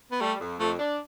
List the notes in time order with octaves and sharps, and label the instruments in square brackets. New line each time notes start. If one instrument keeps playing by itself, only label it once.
[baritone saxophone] B3
[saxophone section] G3 [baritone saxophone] A3
[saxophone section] F2
[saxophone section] F2 [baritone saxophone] A3
[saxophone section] D4